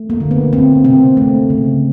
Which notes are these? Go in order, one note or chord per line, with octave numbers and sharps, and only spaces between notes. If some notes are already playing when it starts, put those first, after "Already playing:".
Already playing: A3
A#3
D3
B3
A#3 C4
C3 C4
A3
C#3